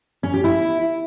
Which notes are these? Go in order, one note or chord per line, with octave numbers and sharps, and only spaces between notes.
C#4
G4
E4